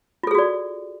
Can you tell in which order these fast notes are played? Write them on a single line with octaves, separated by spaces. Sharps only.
F4 A4 G#4 F#4 D5